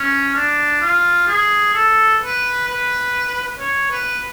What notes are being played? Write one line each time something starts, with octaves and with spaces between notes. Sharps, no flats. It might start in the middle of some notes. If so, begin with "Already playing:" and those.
Already playing: C#4
D4
F4
G#4
A4
B4
B4
C#5
B4